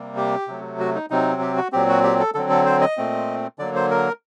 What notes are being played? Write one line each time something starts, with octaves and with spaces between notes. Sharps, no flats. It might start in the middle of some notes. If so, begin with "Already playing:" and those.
Already playing: C3 G3 A#3
G4
C3 F#3 A3
F#4
D#4
C3 F#3 C4 D#4
G4
F#4
A#2 F#3 C4 G4
F#4
G4
A4
D3 F#3 C4 A4
A4
C5
D#5
A#2 A3 C4
D3 F#3 A#3 D5
C5
A#4